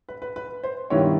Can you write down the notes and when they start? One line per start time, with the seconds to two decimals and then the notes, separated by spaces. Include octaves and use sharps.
0.09 B4
0.22 B4
0.36 B4
0.64 C5
0.90 G2 D#3 G3 B3 E4 C#5